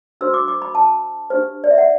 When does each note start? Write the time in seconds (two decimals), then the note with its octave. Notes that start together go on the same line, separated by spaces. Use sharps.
0.21 D4 F#4 C5 E6
0.34 D6
0.48 D6
0.62 B5
0.75 A5
1.30 D4 G4 C5
1.64 D5
1.71 E5
1.78 F#5